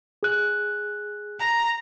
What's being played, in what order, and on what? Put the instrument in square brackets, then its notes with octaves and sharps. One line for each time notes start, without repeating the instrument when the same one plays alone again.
[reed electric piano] G#4 F#6
[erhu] A#5